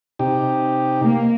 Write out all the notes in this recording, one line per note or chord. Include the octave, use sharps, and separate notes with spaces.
C3 D#4 G4
A#3